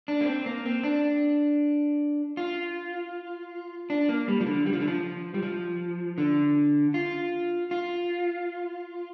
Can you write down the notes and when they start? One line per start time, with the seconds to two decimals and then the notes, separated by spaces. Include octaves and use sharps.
0.08 D4
0.21 A#3
0.26 C4
0.46 A#3
0.65 C4
0.83 D4
2.37 F4
3.90 D4
4.09 A#3
4.28 G3
4.40 F3
4.47 D3
4.66 G3
4.73 F3
4.80 D3
4.88 F3
5.34 G3
5.43 F3
6.18 D3
6.94 F4
7.71 F4